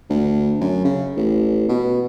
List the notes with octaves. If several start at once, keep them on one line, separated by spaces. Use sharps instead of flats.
D2
F#2
C#3
A1
B2